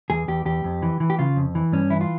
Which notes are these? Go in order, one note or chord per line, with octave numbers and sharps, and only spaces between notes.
E2 G#4
E2 G4
E2 G4
F2
E3
E3
G4
C#3 F4
F2
E3
G2 C#4
E3 E4
F4